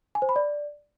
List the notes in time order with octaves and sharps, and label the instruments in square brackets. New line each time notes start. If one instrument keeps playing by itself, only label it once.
[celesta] G#5
C5
B5
D5